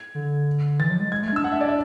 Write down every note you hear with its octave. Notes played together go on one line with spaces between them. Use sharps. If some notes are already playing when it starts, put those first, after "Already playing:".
Already playing: G#6
D3
E3 A6
F#3
G#3
G#3 G#6
A3
G#6
D4 E6
F#5
E5
D5
E5